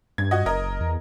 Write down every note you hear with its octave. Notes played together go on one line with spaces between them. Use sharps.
G2 G#6
F#4 D#5
F#1 A#4 D#5
E2